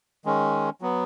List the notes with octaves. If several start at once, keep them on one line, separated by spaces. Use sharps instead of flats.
D#3 G#3 C#4
F#3 B3